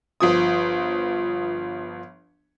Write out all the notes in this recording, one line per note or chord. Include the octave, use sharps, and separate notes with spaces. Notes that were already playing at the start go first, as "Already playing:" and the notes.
G1 F3 D#6